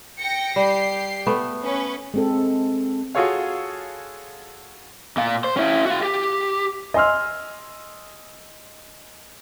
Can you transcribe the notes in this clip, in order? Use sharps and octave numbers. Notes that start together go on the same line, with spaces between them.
G5 A#6 C#7
G3 G4 C7
A3 B3
C#4 B4
G#3 C4 A4
F4 F#4 G#4 A4 C#5 F5
A#2 F5
C5
C#4 E4
F#4 F5
G4
D#5 G#5 C6 E6 F6